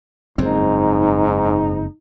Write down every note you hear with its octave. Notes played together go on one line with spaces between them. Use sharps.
F#1 F2 G#2 C4 D#4